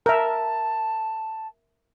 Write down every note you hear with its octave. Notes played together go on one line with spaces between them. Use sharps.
A#4 E5 A5